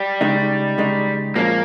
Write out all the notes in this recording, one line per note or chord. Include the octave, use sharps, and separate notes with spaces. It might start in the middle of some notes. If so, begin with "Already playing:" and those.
Already playing: G3
C#3 G#3 D#4
C#3 G#3 D#4
A#2 F3 G#3 A#3 C#4